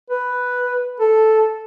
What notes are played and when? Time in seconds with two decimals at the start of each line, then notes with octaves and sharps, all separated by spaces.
0.10 B4
1.00 A4